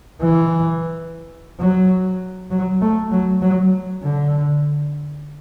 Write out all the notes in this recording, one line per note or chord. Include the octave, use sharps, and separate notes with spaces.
E3
F#3
F#3
A3
F#3
F#3
D3